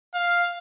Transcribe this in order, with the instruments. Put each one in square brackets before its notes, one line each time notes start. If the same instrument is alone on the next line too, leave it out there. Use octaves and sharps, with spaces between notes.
[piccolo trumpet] F5